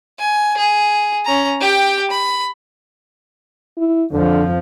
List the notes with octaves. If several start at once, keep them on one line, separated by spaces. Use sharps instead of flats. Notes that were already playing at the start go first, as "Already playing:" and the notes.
G#5
G#4
C#4 A#5
G4 G5
B5
E4
F2 D3 F3